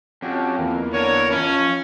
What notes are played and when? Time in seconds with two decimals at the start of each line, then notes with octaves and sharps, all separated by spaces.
0.22 F2 C#4 F#4 G4
0.59 E2 A#3
0.93 D3 A#4 C#5
1.30 F3 C#4 B5